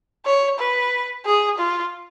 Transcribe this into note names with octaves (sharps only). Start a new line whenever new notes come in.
C#5
B4
G#4
F4